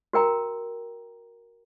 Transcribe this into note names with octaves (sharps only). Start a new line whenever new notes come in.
F#4 A#4 G5 A#5